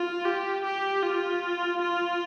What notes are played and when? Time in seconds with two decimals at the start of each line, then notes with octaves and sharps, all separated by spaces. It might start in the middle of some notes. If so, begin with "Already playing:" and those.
Already playing: F4
0.25 G4
0.65 G4
1.04 F4
1.82 F4